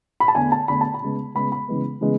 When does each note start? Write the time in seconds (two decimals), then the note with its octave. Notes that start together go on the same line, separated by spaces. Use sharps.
0.20 B5
0.28 A5
0.35 E2 D3 A3 G#5
0.52 A5
0.68 E2 D3 A3 B5
0.81 A5
0.94 B5
1.02 C#3 G#3 B3
1.35 C#3 G#3 B3 B5
1.52 B5
1.68 C#3 E3 G#3 B3
2.01 C#3 E3 G#3 B3